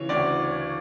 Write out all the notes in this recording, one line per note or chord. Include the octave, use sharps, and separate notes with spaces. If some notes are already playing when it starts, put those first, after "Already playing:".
Already playing: C#3 E3 C#5
D2 D5